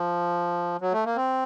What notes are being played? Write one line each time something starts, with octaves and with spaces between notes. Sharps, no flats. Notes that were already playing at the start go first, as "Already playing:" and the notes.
Already playing: F3
F#3
A3
A#3
C4